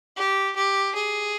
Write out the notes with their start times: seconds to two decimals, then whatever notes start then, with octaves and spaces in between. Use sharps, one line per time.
0.16 G4
0.56 G4
0.95 G#4